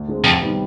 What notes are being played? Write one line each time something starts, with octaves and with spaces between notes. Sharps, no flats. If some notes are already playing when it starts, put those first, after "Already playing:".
Already playing: D2
D3 G#3 C4
F2 C3
D#3 G3 B3